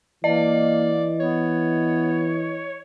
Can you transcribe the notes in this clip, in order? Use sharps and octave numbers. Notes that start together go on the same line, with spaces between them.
E3 A#3 D5 D#5
B3 C#5